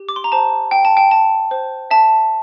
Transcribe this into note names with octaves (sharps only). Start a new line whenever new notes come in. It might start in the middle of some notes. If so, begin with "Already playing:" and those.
Already playing: G4
D6
C6
A#5
C5 A5
G5
A5
G5
G5 A5
C5
E5 A5